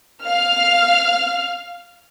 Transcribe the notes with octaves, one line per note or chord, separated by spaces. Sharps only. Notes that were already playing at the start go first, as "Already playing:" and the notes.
F5 F6